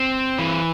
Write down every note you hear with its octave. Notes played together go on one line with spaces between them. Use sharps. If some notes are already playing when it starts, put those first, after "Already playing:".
Already playing: C4
E3